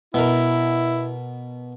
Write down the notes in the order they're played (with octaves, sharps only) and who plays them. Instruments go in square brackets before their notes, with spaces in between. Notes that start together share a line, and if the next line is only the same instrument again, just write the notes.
[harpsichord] B2 A#4 [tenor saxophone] E4